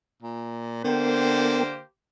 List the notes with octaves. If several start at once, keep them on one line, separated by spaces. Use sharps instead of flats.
A#2
D3 A#3 B3 G4 A#4 C5 G5